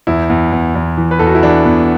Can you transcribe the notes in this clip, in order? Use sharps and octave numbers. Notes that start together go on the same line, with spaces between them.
E2 E4
E2
E2
E2
E3
B4
E2 A4
F#4
E4
E3 D4
E2 B3